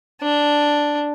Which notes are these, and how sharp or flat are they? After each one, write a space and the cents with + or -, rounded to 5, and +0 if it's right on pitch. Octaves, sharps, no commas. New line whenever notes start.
D4 +0